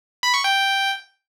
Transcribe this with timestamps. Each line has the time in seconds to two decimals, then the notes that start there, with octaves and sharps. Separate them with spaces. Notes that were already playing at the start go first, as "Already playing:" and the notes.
0.23 B5
0.34 C#6
0.44 G5